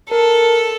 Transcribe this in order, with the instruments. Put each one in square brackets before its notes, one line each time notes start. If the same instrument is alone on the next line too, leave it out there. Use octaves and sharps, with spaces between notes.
[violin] A4 [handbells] A#4